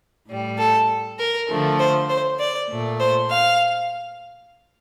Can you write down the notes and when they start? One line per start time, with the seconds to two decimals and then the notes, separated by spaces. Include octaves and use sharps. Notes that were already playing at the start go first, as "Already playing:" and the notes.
0.28 A2 G3
0.58 A4
1.19 A#4
1.49 D3 F3 A3
1.79 C5
2.09 C5
2.39 D5
2.69 A#2 A3
3.00 C5
3.30 F5